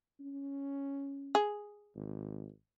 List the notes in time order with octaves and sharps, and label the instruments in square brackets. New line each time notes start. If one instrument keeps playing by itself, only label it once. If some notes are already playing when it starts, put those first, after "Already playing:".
[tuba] C#4
[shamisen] G#4
[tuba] G#1